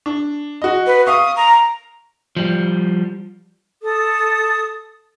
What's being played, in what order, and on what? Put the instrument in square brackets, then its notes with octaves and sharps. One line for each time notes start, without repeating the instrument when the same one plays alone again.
[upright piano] D4
F#4 D#5
[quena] B4
[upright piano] F5 C#6 [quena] D#6
[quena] A#5
[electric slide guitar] F3 G3
[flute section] A4 D#6